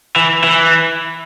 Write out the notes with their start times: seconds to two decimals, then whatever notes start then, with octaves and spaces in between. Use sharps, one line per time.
0.16 E3
0.44 E3